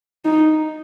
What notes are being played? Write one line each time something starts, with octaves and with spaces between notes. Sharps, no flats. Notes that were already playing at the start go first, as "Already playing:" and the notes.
D#4